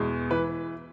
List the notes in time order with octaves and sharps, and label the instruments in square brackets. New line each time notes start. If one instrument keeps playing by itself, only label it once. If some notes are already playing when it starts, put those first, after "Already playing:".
Already playing: [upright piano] E2 B2 G#3
E3 B4